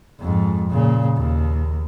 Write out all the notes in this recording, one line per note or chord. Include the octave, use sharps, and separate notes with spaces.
F2 G#2
A#2 C#3
D#2